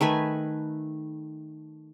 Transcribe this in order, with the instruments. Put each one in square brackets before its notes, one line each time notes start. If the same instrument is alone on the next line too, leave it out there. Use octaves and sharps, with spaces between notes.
[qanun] D#3 A3 B4 G#5